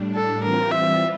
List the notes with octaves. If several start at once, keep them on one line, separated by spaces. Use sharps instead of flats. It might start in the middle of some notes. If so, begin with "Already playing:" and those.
Already playing: A2 G3 D4
A4
E3 G3 C4 F4 A#4
E5